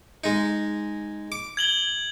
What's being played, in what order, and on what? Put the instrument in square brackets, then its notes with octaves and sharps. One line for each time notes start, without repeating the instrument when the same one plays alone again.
[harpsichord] G#3 D#4
D6
[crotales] G#6 F#7 G7